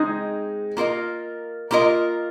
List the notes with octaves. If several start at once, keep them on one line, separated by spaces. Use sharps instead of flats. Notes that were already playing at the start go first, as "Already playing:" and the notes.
Already playing: G#3 C4 D#4 G#4 D#5
A#3 F4 A#4 D#5
A#3 F4 A#4 D#5